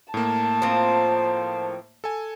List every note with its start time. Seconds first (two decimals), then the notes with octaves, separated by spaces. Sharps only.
0.14 A2 A#3 A5
0.62 F3 C4 C5
2.04 A4 G#5